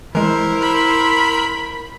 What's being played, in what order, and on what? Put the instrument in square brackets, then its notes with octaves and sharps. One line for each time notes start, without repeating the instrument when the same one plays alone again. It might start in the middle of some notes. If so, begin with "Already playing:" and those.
[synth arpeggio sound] E3 G#3 [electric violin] E4 C5 [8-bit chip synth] A#4
[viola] B5